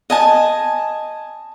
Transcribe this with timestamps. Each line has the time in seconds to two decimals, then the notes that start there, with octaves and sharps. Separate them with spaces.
0.10 D#5 G#5 A5